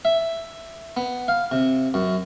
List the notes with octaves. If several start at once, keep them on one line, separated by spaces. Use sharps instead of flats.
E5
B3
F5
C3
F#2